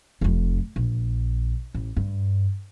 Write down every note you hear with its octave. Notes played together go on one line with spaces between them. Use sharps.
F1 F2
A#1
A1
G2